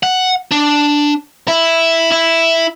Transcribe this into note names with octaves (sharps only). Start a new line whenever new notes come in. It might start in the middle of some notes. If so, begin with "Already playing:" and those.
F#5
D4
E4
E4